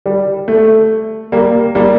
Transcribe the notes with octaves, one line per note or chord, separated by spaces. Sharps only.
G3
A3
G3 A#3
G3 A#3